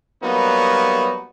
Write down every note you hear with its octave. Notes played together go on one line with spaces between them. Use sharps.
F#3 G3 A#3 B3 D#4 F#4